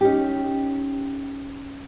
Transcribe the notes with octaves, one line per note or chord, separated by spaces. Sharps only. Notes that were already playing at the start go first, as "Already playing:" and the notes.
C#4 D#4 G4